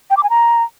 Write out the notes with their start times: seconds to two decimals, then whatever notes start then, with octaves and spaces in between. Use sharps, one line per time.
0.10 G5
0.17 D6
0.23 G#5
0.30 A#5